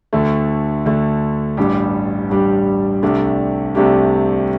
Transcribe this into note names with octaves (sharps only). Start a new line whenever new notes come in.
D2 D3 A3
D2 D3 A3
A1 G2 G3 D4 G4
A1 G2 G3 D4 G4
C2 C3 A3 D4 G4
C2 C3 A3 D4 G4